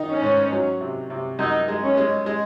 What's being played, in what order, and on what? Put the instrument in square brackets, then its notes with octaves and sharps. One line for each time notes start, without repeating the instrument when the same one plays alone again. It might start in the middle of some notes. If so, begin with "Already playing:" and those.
Already playing: [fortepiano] D#3 D#4
[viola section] C#4
[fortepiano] G#2
F#3
C3
C3
[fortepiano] F#2 [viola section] D#4
[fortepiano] G#3
[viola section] C#4
[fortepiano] G#3
G#3